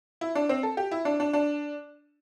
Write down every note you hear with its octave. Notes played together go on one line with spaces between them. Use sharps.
E4
D4
C4
A4
G4
E4
D4
D4
D4